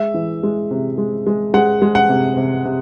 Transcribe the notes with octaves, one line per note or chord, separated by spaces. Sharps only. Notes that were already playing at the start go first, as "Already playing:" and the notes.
Already playing: G#3 E5
E3
G#3
C3
G#3
G#3
G#3 F#5
G#3
F#5
C3
C3
C3